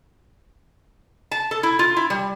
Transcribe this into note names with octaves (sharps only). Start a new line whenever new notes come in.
A5
A4
E4
F4
E4
G3